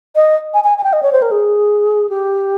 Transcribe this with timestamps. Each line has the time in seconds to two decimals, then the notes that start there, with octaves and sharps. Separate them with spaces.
0.16 D#5
0.54 G#5
0.64 G#5
0.78 G#5
0.84 G5
0.93 D#5
1.03 C#5
1.12 C5
1.22 A#4
1.31 G#4
2.09 G4